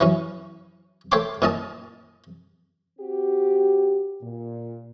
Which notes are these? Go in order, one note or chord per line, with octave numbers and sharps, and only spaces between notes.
E3 F#3 C#4
A3 C#5 E5 G5 C6 D6
A#2 D#3 C#4 D#5 A5
C4 F#4 G4
A#2